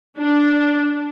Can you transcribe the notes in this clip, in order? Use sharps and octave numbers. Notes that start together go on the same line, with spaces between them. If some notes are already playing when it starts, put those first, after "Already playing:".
D4